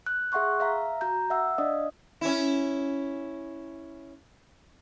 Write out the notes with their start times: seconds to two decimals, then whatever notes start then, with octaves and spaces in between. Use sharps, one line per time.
0.06 F#6
0.32 G#4 E5 F#5 C6 C#6 F#6
0.60 E5 F5 A#5
1.01 F#4 A#5 G6
1.30 E5 F#5 E6
1.58 D4 D5 D#5 F5 D#6
2.21 C#4 E4